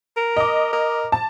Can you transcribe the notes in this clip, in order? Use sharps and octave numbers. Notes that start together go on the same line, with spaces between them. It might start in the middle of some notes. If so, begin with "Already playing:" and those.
A#4
D#5 D6
A#4
A5